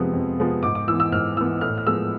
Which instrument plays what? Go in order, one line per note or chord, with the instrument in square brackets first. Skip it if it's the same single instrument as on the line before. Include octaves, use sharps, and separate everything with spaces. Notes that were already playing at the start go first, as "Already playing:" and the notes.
Already playing: [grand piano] F2 C3 F3 G#3 B3
F2
C3 F3 G#3 B3
G#2 D6
D6
E3 E6
B3
E6
G#2 F6
E3 B3 E6
A2 F6
F6
F3 G#3 B3 E6